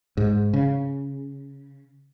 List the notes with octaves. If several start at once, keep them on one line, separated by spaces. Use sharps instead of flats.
G#2
C#3